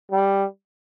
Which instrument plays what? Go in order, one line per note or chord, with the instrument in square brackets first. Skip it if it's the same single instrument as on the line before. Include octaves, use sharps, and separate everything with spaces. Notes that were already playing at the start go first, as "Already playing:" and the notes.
[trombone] G3